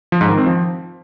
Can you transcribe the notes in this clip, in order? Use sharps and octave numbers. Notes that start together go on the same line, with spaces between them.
F3
G#2
D#3
C4
F3